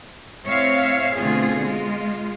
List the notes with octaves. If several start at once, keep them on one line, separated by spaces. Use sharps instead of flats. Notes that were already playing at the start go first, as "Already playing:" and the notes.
A2 C4 C#5 E5 F5
B2 D3 A3 C4 F4 G#4
G#3 F4